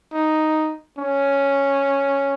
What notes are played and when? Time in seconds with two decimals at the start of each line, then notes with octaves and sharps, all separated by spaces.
0.13 D#4
0.98 C#4